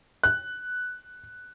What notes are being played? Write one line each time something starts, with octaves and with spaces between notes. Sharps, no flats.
F#6